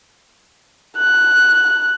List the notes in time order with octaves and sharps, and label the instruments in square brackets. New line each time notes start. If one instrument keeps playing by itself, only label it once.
[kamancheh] F#6